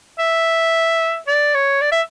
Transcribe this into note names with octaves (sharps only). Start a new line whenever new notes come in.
E5
D5
C#5
D5
E5